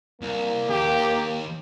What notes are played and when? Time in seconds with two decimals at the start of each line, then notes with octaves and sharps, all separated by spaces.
0.22 C2 A#3
0.70 D#2 G4